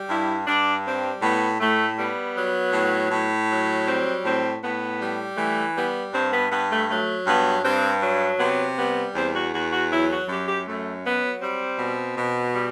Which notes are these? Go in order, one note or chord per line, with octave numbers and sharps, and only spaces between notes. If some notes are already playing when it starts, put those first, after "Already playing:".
Already playing: G3
G2 E4
G2 D4
G3 C4
A2 B3
A2 A3
G3 B3
F#3
A2
A2
F#3
G3 C4
A2 C4
A2 B3
G3
E3 A3
G3 B3
G2 C4
B3
G2 B3
A3
F#3 A3
G2 B3
G2 C4
F#3
C3 B3
G3 B3
E2 C4
F#4
E2 F#4
F#4
F#3 E4
F#4
F#2 G4
G4
F#2 A3
F#3 B3
G3 C4
B2
B2
G3